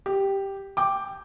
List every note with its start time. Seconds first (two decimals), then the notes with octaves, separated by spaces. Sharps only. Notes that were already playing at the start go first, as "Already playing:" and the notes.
0.06 G4
0.77 G5 D6